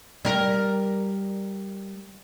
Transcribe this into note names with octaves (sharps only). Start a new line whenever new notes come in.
G3 A#4